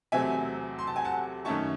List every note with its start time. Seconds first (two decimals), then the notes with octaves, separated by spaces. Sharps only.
0.12 E2 C3 F#3 A3 C4 E5 G#5
0.79 C6
0.87 A5
0.96 G#5
1.05 F#5 A5
1.45 F#2 D#3 A3 C#4 A5 C#6